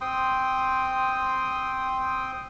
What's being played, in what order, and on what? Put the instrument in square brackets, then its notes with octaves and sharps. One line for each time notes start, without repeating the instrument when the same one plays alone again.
[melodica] C4 G5 C6 D#6